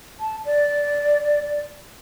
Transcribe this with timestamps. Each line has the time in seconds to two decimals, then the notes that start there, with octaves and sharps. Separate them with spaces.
0.20 A5
0.45 D5